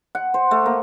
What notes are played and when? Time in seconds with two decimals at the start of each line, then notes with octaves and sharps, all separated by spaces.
0.15 F#5
0.34 C5
0.51 A3
0.66 A#3